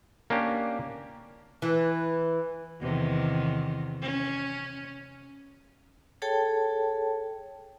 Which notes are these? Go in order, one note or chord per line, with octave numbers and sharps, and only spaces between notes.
A#3 C#4 D4 G4
E3
E2 C3 D#3
C#4
G#4 A4 C#5 G5 A5